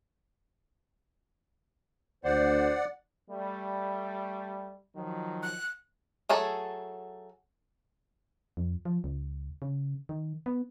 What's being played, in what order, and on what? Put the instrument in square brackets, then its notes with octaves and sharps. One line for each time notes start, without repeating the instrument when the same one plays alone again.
[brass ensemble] D2 [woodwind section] C5 [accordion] D5 F#5
[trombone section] G3 A3
D#3 F3 F#3
[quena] F#6
[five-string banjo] F#3 A3 G#4 A4
[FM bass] F2
F3
C#2
C#3
D#3
B3